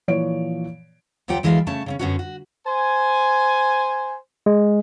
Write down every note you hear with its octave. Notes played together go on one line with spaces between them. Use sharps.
A#2 E3 F3 C#5 D7
D2 F#3 F4 G4 F#5 G5
D2 E3 G#3 A4 A#4 F5
C#3 A3 C#4 A5
C#3 C4 C#4
F#2 D3 B3 C#4 D#4 F#4
F#4
C5 G#5
G#3